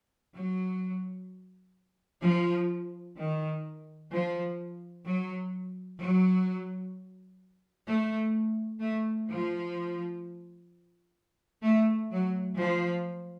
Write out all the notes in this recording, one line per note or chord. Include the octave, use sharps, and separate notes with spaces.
F#3
F3
D#3
F3
F#3
F#3
A3
A3
F3
A3
F#3
F3